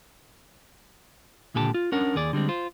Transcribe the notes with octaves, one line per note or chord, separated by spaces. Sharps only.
C#2 A#2 D3 G4 G#5 A5
F4
C#4 D4 A#4 F#5
D#2 G#4 D5
D3 G3 G#3 C4
F4 C5